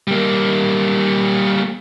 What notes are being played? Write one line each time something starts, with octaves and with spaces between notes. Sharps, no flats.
G3 A#3